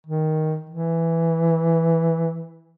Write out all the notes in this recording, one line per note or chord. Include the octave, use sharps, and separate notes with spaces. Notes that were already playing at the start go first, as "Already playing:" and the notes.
D#3
E3